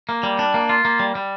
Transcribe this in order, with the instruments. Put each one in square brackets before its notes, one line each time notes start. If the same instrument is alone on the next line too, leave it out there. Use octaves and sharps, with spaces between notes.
[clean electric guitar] A#3
G3
D4
A#3
F4
A#3
G3
G3